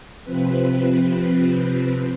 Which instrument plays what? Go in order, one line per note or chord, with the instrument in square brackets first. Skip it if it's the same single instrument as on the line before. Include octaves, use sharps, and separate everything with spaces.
[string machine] C3 F3 C4 B4